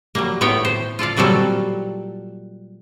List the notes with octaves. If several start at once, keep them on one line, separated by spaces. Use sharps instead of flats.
F#3 G3 A#3
A2 B3 C#5 G5
C5
F4 A4 D5 F5
A#2 F#3 G3 C4 A4